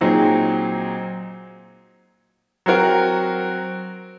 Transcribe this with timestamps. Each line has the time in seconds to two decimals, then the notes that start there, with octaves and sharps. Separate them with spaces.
0.01 A#2 F#3 C4 D#4 G#4
2.66 F#3 C4 F#4 A#4